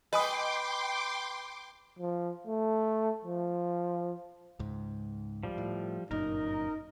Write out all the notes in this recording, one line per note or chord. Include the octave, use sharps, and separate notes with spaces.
B4 D#5 G5 G#5 C6 D6 D#6
F3
A3
F3
C#2 G#2
F3 G3
A2
G1 F#2 A#2 D#4 A#4